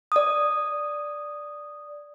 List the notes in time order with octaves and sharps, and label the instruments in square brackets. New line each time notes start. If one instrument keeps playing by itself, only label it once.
[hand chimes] D5 D#6